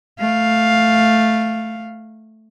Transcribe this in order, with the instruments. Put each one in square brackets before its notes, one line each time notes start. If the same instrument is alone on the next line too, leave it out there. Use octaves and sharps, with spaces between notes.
[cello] A3 F5